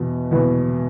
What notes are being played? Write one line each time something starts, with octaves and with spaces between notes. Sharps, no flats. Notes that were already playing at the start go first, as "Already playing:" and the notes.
Already playing: E2 B2 B3
E2 B2 B3